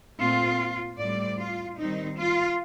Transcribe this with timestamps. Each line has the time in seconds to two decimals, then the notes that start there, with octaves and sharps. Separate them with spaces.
0.19 A#2 A3 C4 F4
0.98 A2 G3 C4 D5
1.39 F4
1.78 D#3 G3 C4 D#4
2.17 F4